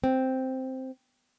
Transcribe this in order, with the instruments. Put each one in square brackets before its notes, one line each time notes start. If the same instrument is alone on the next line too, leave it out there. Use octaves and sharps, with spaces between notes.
[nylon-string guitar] C4